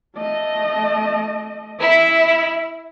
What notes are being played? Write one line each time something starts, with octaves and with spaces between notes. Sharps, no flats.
A3 D#5
E4 E5